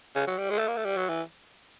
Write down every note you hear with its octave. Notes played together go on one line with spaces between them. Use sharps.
C#3
F#3
G3
G#3
A3
A#3
A3
G3
F#3
E3